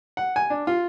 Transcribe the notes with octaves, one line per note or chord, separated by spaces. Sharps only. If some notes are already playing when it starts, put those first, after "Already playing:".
F#5
G#5
D4
F4